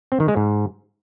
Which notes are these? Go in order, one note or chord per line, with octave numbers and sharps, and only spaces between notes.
C4
D#3
G#3
G#2